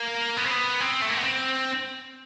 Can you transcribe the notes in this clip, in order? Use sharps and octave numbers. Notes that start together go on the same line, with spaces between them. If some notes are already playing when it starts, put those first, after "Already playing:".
Already playing: A#3
B3
C4
B3
C4
A3
A#3
B3
C4